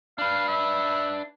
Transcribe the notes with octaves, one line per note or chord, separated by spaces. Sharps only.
D4 B4 F5
E5